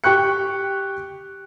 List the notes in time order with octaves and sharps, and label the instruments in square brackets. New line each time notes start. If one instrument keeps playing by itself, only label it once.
[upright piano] G4 G5 C#6 F#6 C#7